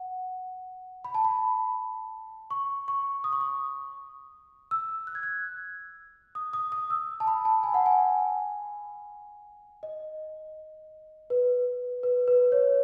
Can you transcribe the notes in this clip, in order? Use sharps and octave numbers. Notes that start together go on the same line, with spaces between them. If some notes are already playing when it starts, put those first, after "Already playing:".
Already playing: F#5
B5
A5
B5
C#6
C#6
D#6
C#6
D#6
E6
F#6
G#6
F#6
D#6
D#6
D#6
E6
A5
B5
A5
G#5
F#5
G#5
D#5
B4
B4
B4
C#5